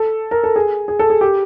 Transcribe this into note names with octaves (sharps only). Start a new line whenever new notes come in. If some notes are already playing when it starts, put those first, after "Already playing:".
Already playing: A4
A#4
A4
G#4
G#4
A4
G#4
G4